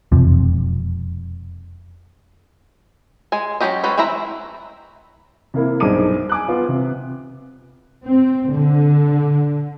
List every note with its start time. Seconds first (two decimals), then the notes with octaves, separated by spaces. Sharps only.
0.12 E1 F2 C3 F3
3.32 G#3 G#5
3.60 F#3 C4 C#4 G4 D#5
3.84 G#3 C#4 F#4 A4 B4
3.98 E3 C4 E4 E5 A#5
5.54 C3 A#3 E4
5.80 B1 G2 G#4 C5 D6 D#7
6.29 G#5 D6 F#6
6.48 B3 F4
6.69 C3
8.06 C4
8.53 D3